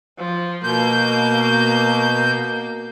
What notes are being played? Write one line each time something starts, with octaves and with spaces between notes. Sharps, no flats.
F3
B2 A#3 G6